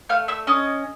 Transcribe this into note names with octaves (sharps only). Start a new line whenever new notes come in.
A3 F5 F6
E5 E6
C#4 D#5 D#6